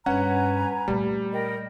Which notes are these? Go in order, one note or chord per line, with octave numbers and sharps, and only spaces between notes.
G2 C#4 B4 F#5 G#5 A#5
A#2 G3 A3
A#4 D#5 G5